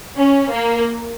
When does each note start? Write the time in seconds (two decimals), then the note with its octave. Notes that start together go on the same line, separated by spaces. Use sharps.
0.17 C#4
0.51 A#3